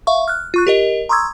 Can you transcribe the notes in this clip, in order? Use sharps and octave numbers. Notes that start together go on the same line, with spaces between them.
E5 F5 C#6
F6 F#6
F4 C#6 F#6
G4 A#4 D#5
A#5 C6 C#6 D#6 E6 G#6